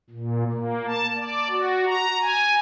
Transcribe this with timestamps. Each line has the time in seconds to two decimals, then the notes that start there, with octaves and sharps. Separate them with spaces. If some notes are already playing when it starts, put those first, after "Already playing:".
0.10 A#2
0.52 A#3
0.86 A5
1.16 D5
1.50 F#4
1.86 A#5
2.21 G#5